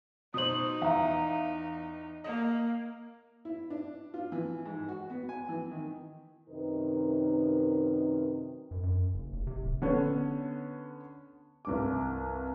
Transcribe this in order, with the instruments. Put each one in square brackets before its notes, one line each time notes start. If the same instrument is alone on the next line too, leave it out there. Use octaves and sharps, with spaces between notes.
[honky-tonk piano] B2 C5 [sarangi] D#4 [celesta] D#6 F#7
[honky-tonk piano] E2 [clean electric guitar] E5 F5 A#5
[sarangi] A#3 [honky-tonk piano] D#5
[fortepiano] E4
D4
F4
E3
G#2
F#4
B3
G#5
E3
D#3
[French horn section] F#2 C3 D#3 D#4 A#4 B4
[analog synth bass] F#2
F#2
F#1
F1
C3
D1
[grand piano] D3 B3 C#4
C2 G2 D6